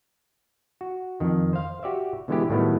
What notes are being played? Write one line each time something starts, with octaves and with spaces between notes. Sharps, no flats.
F#4
F2 D#3
C5 F5
F#4 G4 D5 E5
B2 D3 E3 G#3 E4 G4
A2 D#3 F#3 G3 A3 B3